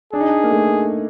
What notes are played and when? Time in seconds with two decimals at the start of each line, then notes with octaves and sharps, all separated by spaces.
0.13 D4 G#4
0.20 D#4
0.27 D4
0.44 A#3
0.50 A3